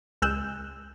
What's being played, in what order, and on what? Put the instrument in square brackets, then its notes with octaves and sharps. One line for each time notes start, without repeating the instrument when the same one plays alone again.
[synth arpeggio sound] C#2 G#3 E6 F#6 G6 E7